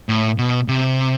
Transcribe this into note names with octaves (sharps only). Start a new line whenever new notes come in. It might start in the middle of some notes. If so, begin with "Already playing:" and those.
A2
B2
C3